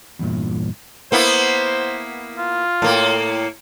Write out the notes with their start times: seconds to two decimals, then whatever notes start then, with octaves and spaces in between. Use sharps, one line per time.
0.19 E2 G2 A#2
1.12 A#3 B3 E4 C5
2.38 F4
2.82 A2 A#3